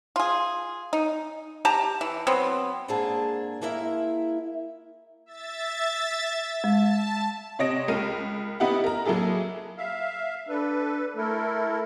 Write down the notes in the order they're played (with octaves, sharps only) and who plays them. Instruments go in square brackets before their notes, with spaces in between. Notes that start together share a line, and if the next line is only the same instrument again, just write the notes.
[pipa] F4 G#4
D#4
G4 A5 A#5
E3
F#3 B3 C4
[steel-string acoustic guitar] G#2 A#3 C4 D4 G#4 A5
G#3 A#3 E4 A#4 E5
[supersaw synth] E5 A6
[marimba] G#3 [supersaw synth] A5
[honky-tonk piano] C3 C#5 D#5 A#6 D7 E7
C#2 A#4 D#7
B3 D#4 E4 G4 F#5
A#4 A#5
F#3 A#3 E4 G#4 A4
[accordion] E5 F5
[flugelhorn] D4 [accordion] A4 B4
[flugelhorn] A3 [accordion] E4 A4 A#4